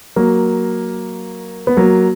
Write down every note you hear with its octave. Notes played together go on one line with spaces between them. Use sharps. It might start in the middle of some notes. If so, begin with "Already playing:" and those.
F#3 A#3
B3
F#3 A#3